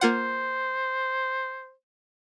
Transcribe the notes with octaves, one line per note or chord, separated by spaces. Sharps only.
A#3 F4 C5 F#5